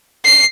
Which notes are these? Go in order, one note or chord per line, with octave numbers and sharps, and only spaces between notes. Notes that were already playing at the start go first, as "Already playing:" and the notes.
C7